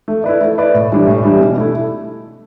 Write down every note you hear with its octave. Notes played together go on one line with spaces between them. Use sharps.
A3
E4 B4 D5
A3
E4 B4 D5
A2
E3 G3 D4
A2
E3 G3 D4
B2
A3 E4